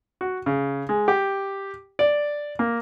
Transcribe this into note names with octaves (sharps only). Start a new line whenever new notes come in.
F#4
C#3
G#3
G4
D5
A#3